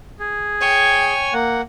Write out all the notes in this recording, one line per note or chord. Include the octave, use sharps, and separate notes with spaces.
G#4
C#5 G5 G#5 C#6
A#3 F#5